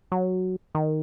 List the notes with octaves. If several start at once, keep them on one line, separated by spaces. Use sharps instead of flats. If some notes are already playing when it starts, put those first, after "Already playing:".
F#3
D#3